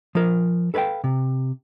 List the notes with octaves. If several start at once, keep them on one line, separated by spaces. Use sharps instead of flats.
F3 A#4
A4 B4 C#5 F5 G5
C3